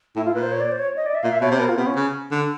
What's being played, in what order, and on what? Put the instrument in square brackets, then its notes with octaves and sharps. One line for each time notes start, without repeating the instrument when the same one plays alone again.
[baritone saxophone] A2 [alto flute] E4
[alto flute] F4
[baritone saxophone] A#2 [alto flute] B4
[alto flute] C5
C#5
D5
C5
C#5
D#5
D5
E5
[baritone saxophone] A#2 [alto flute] F5
[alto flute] E5
[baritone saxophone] B2 [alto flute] C#5
[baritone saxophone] C3 [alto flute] C5
[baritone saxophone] B2 [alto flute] A#4
[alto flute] F4
[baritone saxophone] C3 [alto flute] B3
[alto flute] C#4
[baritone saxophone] C#3
D3